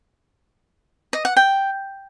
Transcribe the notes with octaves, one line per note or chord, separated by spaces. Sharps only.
D#5
F#5
G5